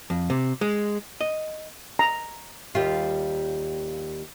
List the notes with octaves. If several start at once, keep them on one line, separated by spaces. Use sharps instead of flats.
F2
C3
G#3
D#5
A#5
D#2 G3 F4